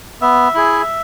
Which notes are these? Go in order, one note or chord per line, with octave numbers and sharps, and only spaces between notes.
B3 E5
E4 G#4